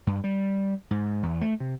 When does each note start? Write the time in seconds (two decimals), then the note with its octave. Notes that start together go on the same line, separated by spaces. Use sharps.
0.07 G2
0.24 G3
0.91 G#2
1.23 E2
1.41 A3
1.60 C3